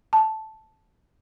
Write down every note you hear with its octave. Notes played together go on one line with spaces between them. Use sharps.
A5